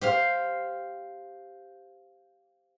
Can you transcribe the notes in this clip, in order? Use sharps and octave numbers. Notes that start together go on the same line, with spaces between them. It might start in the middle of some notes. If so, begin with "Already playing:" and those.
G4 C5 F5